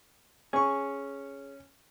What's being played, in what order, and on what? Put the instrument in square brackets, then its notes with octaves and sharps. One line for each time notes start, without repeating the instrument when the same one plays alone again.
[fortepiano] C#4 C#6 [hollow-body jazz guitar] G#4